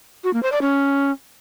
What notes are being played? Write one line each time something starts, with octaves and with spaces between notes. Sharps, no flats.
F#4
A#3
C5
D5
C#4